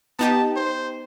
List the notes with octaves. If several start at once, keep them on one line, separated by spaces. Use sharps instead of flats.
B3 D#4 G4 A5
C5